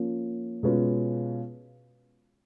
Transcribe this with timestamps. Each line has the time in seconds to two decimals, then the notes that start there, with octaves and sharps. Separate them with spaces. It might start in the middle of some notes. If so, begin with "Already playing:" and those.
Already playing: F3 A#3 C#4
0.63 B2 G#3 C#4 F4 B4